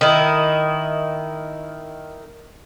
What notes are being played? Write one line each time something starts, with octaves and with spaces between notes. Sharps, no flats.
D#3 E4